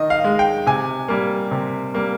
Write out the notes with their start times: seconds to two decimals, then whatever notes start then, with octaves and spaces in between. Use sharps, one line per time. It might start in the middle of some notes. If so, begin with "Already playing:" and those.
Already playing: D#3 D#5
0.10 F5
0.24 G#3
0.39 G5
0.67 C3 G#5
1.08 G3 A#3
1.51 C3
1.94 G3 A#3